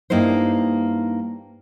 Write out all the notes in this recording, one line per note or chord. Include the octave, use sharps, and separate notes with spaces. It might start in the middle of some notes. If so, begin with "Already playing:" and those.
G2 A#3 D#4 E4 C5